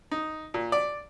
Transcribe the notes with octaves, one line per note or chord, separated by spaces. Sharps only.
D#4
A#2
D5